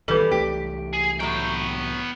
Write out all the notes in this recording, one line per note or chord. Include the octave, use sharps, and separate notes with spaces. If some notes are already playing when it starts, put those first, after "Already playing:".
D1 G1 D#3 E3 G3 A4 B4
C2 E3 A3 G4
G#4
A2 F#3 B3 G5